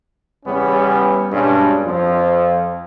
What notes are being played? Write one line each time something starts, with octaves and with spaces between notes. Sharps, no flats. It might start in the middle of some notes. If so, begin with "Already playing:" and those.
E2 C#3 G3 B3 C#4
G2 B2 G3 G#3 C#4 D4
F2 F3